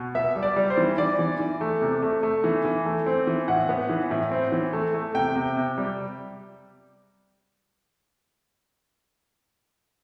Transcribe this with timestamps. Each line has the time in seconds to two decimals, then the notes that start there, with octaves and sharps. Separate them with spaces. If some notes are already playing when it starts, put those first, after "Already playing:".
Already playing: B2
0.15 B3 E5
0.36 G3
0.43 D5
0.56 G3
0.70 C5
0.77 E3
0.98 E3 D5
1.19 E3
1.40 E3
1.61 A3
1.81 C3
2.02 A3
2.23 A3
2.44 E3
2.65 E3
2.86 A3
3.06 C4
3.27 E3
3.48 A2 F#5
3.69 B3
3.90 E3
4.11 A2
4.32 C4
4.52 E3
4.73 A3
4.94 A3
5.15 C3 G5
5.36 C3
5.56 C3
5.78 G3